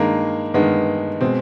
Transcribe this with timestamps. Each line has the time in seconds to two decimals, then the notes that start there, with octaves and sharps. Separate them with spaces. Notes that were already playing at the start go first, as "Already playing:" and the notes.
Already playing: G2 D#3 G#3 A#3
0.54 G2 D#3 G#3 B3
1.21 B2 G#3 C4